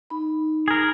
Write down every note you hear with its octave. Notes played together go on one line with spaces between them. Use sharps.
D#4 B5
G#4 A#4